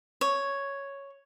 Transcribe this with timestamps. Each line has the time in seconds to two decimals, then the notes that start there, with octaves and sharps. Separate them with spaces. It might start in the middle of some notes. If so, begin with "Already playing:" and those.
0.21 C#5